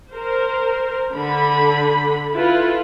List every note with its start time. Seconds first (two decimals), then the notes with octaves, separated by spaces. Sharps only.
0.10 A#4 C5
1.14 D3 B5
2.34 E4 F4 A4 B4